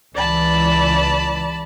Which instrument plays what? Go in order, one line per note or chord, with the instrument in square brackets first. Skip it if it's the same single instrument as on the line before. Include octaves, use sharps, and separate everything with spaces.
[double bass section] C#2 E3 [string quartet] D5 A5 B5